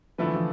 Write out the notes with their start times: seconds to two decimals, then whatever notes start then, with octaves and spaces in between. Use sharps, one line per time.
0.18 D3 F3 A3 E4 B4
0.27 E3
0.35 F3